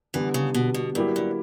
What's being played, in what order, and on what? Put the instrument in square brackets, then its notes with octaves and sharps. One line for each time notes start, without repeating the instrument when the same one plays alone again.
[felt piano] D3 G3 B3 [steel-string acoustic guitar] E3
[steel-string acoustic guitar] C#3
B2
B2
[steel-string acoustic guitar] G2 [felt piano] F#3 A#3 E4 G4
[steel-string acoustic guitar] G2